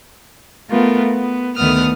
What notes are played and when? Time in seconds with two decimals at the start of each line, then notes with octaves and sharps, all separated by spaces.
0.71 A3 B3 F4 A#4
1.12 B3
1.57 D2 D#3 A3 B3 D#6 F6